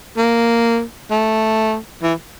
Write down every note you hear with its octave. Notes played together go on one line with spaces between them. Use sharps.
A#3
A3
E3